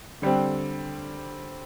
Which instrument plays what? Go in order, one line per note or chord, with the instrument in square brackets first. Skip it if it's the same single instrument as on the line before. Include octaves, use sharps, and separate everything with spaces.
[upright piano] D3 G3 C4